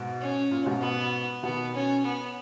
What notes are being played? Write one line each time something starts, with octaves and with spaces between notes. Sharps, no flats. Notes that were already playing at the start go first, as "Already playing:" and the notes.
Already playing: G#2 B2
C#4
A#2
G#2 B2
B3
B2 D#3 B3
C#4
B3